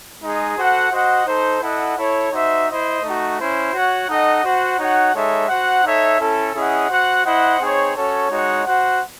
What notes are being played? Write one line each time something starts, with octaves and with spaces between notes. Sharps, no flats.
G#3 D#4 G#4
F#4 A4 C5 F#5
F#4 C5 D#5 F#5
D#4 A4 C5
E4 A4 D#5 F#5
E4 A4 C#5
D#4 F#4 C5 E5
E4 C5 D#5
A3 D#4 F#4
C#4 E4 C5
F#4 C#5 F#5
D#4 A4 D#5 F#5
F#4 C5 F#5
D#4 F#4 C#5 F#5
G#3 D#4 A4 C#5 E5
F#4 C5 F#5
D#4 A4 C#5 E5
C#4 E4 A4
C#4 E4 G#4 D#5 F#5
F#4 C5 F#5
E4 C5 D#5 F#5
C4 D#4 G#4 C#5
C#4 F#4 A4 C#5
G#3 D#4 F#4 C#5 F#5
F#4 C5 F#5